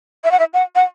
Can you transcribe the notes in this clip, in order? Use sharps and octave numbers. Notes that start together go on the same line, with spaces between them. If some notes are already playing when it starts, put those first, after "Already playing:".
E5
F#5
E5
F#5
F#5